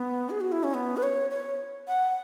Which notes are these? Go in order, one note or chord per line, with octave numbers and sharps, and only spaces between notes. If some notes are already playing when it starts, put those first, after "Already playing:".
Already playing: B3
G#4
F#4
E4
C#4
B3
B4
C#5
C#5
F#5